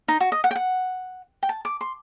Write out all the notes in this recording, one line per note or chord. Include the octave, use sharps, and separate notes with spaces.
D#4
F#4
D#5
F#5
G5
F#5
G5
A5
D6
C6